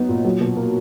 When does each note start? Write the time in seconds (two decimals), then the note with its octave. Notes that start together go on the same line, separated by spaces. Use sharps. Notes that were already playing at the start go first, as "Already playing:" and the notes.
Already playing: F#3 B3 D#4
0.09 A#2
0.25 F#3
0.41 B2
0.57 A#3